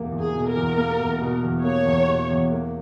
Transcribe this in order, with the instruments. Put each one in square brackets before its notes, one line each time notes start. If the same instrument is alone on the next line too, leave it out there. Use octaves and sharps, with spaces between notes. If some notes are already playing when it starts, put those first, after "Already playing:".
Already playing: [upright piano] E2 B2 A#3
E2
[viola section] G#4
[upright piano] B2
[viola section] A#4
[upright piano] E2
A#3
E2
B2
E2
[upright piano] A#3 [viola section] C#5
[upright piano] E2
B2
E2
A#3